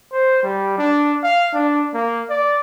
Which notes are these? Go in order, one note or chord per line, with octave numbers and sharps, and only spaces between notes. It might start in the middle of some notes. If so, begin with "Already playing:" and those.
C5
G3
D4
F5
D4
A#3
D5